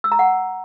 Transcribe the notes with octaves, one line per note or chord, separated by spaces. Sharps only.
E6
A#5
F#5